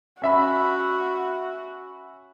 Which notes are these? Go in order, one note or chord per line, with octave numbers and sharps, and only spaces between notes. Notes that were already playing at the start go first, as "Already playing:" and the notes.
C#4 F#4 E5 B5